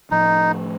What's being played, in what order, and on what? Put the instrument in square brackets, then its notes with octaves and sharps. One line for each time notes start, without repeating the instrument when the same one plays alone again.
[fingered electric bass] A2 F3 A3 [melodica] D#4